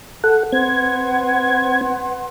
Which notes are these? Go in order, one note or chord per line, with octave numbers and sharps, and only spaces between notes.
A4 F#5
C4 B4 F#5 C6 G#6